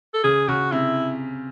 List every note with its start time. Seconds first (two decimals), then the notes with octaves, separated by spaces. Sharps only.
0.14 A4
0.24 C#3 G#4
0.48 C#3 F#4
0.72 C3 E4